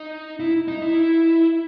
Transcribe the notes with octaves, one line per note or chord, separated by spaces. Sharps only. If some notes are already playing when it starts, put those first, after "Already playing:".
Already playing: D#4
E4
D#4
E4